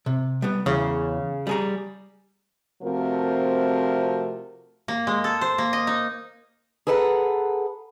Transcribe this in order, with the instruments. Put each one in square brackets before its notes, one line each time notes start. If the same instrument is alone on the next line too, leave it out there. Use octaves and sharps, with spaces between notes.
[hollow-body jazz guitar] C3
G3 B3
[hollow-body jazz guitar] E2 [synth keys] C#3
[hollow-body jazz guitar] G3 G#4 A#5
[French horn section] C3 F3 A3 C4 F#4 A#4
[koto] A#3
G#3
A4
C5
A#3
D#5
D#4
[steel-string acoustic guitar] G#4 A4 B4 F#5 G#5 A#5